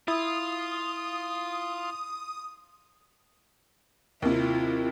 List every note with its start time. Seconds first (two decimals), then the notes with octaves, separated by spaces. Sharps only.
0.08 E4 F4 D#6
4.22 D#2 C3 E4 F4